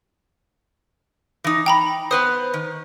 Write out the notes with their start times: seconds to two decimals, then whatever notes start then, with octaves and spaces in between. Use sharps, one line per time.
1.44 E3 D#4
1.66 G5 A#5 B5
2.11 B3 B4 C5 D#6
2.54 D#3